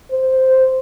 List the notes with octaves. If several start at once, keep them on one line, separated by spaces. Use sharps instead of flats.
C5